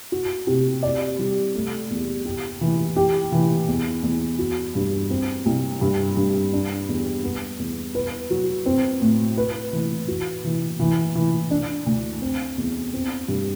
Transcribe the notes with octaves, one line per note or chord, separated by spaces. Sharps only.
F#4
C3
D5
G3
A3
E2
G4
E3
G4
E3
E2
E2
F#4
G2
C4
C2
G2
G2
D4
E2
B3
E2
B4
F#3
C4
A2
B4
E3
F#4
E3
E3
E3
D4
D2
C4
E2
C4
G2